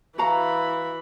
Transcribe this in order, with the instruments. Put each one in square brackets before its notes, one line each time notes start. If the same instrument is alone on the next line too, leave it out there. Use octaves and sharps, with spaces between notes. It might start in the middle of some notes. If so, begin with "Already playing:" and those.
[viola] E3 B5 [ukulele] F#4 F5 A#5